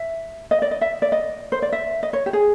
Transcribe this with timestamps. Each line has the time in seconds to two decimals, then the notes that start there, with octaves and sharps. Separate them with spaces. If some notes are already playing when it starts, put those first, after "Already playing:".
Already playing: E5
0.51 D#5
0.62 D5
0.71 D#5
0.81 E5
1.02 D5
1.12 D#5
1.52 C5
1.62 D5
1.73 E5
2.03 D#5
2.13 C#5
2.26 G4
2.33 G#4